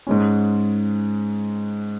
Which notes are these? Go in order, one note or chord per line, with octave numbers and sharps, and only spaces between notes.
G#2 G#3 C#4